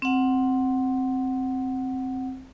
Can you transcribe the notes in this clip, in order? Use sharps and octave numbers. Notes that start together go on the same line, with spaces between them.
C4 F#5